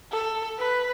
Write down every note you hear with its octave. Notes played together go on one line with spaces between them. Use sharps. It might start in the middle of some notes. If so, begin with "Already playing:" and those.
A4
B4